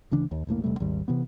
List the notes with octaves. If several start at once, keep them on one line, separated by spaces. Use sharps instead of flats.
D2 C#3 E3 D4
D#2
E1 A1 A2 A#3
E1 C3 G3 A3
G#1 D#2 G3
C3 E3 B3